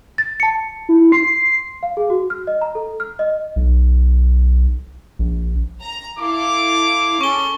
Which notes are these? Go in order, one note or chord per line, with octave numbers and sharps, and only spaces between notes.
A6
A5 C#7
E4
C6 C7
F5
G#4
F#4
F6
D#5
A#5
A4
F6
D#5
B1
A#1
A#5
E4 A4 F5 D6
C#4 G#4 A4 C#6 G7